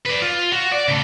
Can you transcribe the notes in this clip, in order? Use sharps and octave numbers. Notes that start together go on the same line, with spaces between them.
B4 D5
F4
F#4
D5
C#3 A3